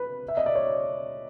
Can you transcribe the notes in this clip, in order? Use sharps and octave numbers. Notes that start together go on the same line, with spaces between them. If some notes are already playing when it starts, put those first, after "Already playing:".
Already playing: B4
E5
D#5
D5
C#5